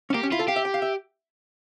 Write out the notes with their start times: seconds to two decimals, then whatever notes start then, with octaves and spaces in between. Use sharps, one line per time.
0.10 C#4
0.14 A#3 G4
0.23 C#4
0.32 E4 F4
0.39 A4
0.48 G4 F5
0.56 E5
0.65 G5
0.74 F5
0.82 E5